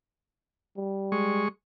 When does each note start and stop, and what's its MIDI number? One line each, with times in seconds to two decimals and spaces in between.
0.77 1.47 55
1.12 1.48 56
1.12 1.48 85